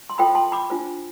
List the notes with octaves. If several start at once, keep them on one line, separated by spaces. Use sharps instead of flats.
C6
F4 A4 C5 G5 B5
A5 C6
B5 D6
D4 F4 C5